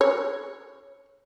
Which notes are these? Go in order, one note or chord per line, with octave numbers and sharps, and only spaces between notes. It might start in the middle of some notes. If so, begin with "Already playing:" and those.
C#5